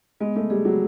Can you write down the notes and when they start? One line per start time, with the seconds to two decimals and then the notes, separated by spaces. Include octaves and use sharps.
0.20 G#3 B3
0.36 A3
0.50 G3 G#4
0.65 F#3